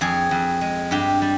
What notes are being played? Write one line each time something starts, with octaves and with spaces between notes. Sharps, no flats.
F2 G#4
F2
G#3
G2 G4
G3